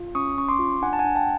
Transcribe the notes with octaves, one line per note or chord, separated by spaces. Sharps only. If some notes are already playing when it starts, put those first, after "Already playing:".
Already playing: F4
C#4 C#6 D#6
C#4 C#6
C6 D6
F4
D4 F#5 G#5
A5
F#5 G#5
D4
G5 A5